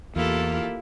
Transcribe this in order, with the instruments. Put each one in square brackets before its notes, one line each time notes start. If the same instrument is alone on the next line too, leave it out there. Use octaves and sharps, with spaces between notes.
[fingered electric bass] E2 [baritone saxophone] A#3 [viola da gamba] E4 G4 A4 [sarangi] F4